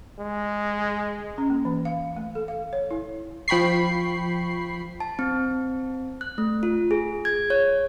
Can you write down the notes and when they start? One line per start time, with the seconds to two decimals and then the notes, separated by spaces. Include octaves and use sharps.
0.20 G#3
1.38 C#4
1.50 A#3
1.65 E3
1.85 F5
2.16 A3
2.35 A4
2.48 F5
2.73 C#5
2.91 E4
3.48 F3 G5 B5 C#6 C7
5.00 A5
5.19 C4
6.21 F#6
6.38 A3
6.63 F4
6.91 G#4
7.25 G#6
7.50 C#5